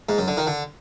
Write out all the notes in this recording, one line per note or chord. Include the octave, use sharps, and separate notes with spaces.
G#2
F#2
D3
D#3
D3